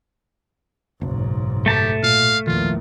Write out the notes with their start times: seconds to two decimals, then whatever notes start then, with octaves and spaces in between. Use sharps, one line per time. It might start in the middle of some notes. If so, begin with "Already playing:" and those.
1.01 F#1 B1 G#2
1.66 A3 G4 A5
2.03 A#2 F5
2.47 A#1 E2 D#3 F3 F4